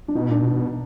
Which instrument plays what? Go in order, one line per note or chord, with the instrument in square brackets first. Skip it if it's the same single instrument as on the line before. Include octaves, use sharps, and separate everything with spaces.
[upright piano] D4
[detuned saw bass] B2 [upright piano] D#4
[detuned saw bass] A#2 [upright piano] D4
[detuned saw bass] B2
[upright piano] D4